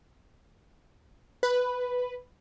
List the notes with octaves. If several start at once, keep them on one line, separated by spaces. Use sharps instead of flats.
B4